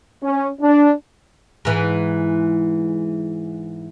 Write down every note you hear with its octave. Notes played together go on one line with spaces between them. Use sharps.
C#4
D4
G#2 E3